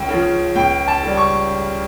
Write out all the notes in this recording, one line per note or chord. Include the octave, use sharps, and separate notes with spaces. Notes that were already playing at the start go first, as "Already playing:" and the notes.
Already playing: C#2 G5
C#3
F3
C#2 G5
A5
C#3 G3
C#6